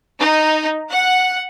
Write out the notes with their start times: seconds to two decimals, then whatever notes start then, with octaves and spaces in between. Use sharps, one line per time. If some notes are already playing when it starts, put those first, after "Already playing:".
0.19 D#4
0.89 F#5